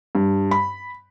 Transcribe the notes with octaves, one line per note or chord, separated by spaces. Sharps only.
G2
B5